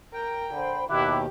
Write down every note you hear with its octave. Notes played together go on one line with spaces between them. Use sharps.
A#4 G5
D3 C5 B5
D#2 B2 D#3 E4 G4 D6 F#6